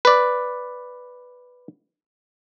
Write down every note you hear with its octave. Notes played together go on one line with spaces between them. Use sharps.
B4 D5